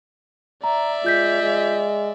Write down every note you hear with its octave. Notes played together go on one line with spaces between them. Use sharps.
D5 E5 A#5
G#3 F4 G6 B6
G#3